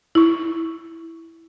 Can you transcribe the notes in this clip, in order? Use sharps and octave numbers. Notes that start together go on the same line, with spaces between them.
E4 C#6